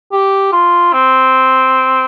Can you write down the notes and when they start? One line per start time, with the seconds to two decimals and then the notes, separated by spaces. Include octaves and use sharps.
0.12 G4
0.53 F4
0.93 C4